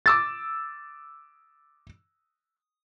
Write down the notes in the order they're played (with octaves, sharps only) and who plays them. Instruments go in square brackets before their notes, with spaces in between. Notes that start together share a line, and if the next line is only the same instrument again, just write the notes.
[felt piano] D6 E6 A6